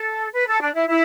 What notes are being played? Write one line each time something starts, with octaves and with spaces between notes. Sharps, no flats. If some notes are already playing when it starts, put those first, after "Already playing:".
Already playing: A4
B4
A4
D4
E4
E4